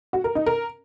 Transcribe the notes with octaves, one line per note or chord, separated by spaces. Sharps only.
F#4
A#4
D#4
A#4